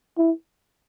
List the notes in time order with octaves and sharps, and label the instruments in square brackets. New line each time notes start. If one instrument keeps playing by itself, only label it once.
[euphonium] E4